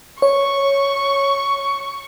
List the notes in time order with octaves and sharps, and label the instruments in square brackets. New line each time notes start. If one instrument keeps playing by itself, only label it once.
[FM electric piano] C#5 [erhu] C#6